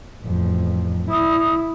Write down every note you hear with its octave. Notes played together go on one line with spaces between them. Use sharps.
A1 F2
E4 D#6